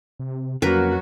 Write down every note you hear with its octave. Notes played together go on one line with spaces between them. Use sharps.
C3
F2 C#3 F#3 A#3 F#4 A#4 B4